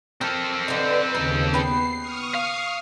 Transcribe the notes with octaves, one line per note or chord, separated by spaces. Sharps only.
C4 A4 A#4
D3 D#4 B4
D#2 C#3 D#4
B3 G5 C7
C#6 D#6 F6
F5